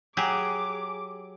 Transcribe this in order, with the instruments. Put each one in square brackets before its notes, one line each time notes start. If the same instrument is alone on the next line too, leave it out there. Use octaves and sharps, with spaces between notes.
[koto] F#3 G4 G#4 [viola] D6